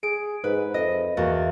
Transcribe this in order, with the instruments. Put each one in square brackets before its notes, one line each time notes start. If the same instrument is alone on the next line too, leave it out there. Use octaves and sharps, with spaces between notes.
[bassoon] G#4 [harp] D7
[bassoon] G#2 [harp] B4
[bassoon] F2 [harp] D#5
[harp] E2 F#4 A6 [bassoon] A#3